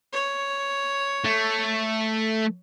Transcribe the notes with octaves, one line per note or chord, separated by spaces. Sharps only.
C#5
A3